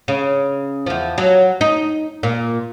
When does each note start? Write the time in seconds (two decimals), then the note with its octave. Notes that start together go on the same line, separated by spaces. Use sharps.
0.08 C#3
0.86 E2 F3
1.18 F#3
1.61 D#4
2.23 A#2